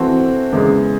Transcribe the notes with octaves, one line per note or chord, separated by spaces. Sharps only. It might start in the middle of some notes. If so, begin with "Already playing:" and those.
Already playing: E3 C4 F#4 A4
E2 C#3 G#3